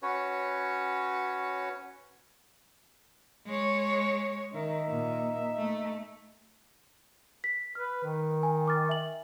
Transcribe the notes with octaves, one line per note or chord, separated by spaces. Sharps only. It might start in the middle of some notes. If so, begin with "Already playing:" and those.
C#4 F#4 B4 C#5
G#3 C#5
D#3 D#4 E5
A#2
A3
B6
B4 F6
D#3
G#5
D6 F6 A6
E5 G#5 F#7